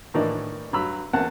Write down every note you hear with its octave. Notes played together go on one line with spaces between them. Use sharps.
A2 D#3 E3 A#3 D4 D#4
G2 F#3 B5 E6
E2 A#3 C4 C#4 F#5 A5